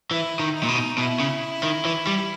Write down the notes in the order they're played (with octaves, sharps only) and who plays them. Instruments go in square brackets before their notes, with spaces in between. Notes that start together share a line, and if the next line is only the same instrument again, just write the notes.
[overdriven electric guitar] E3 [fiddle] E4
[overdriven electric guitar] D#3
[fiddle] D#4
[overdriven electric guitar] A#2
B2
[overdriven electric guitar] B2 [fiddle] E4
[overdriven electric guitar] C#3
D#3
E3
G3